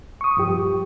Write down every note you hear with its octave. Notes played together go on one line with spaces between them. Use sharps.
C#6 D#6
G2 F3 G4